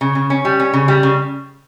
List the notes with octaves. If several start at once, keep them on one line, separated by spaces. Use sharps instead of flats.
C#3
C#3
C#4
G3
C#4
C#3
G3
C#3